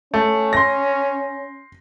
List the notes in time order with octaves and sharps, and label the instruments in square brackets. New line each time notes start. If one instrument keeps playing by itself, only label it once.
[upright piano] A3 [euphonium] C#4
[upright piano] C6 A#6